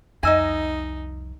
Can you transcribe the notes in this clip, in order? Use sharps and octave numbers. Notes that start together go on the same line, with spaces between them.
C2 F2 D#4 D#5 E5 G#5 A#5 E6